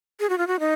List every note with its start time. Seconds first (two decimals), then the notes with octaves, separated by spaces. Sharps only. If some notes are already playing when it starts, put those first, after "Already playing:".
0.20 G#4
0.29 F#4
0.38 F4
0.47 F#4
0.60 D#4